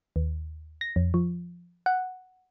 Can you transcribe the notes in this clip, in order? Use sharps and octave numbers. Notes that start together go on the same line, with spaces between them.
D#2
A#6
F2
F3
F#5